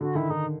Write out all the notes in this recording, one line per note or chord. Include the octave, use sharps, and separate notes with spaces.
D3 F#4
D#3 E4
D#3 D#4